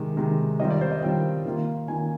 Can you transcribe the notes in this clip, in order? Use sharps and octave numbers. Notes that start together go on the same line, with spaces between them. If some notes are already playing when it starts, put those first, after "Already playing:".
Already playing: C3 D#3 G#3
C3 D#3 G#3
D#3 G3 C4 F4 D#5
D5
C5
D#5
D#3 G3 C4 F4 G5
D#3 A#3 F4
D#3 A#3 F4 G#5